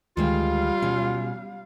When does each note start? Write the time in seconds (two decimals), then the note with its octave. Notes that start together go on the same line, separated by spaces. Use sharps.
0.17 D2 D#3 G3 G#3 F4 F5 G5
0.82 B2 F#3 C#4